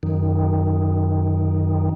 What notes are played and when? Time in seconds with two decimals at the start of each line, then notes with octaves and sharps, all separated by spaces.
0.03 F#2 D#3